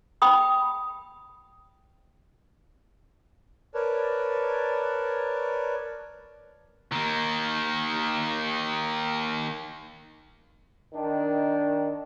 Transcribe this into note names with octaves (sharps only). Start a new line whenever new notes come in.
G5 B5 D#6
A#4 B4 C#5 D5 A5
D#3 A#3
D#3 D4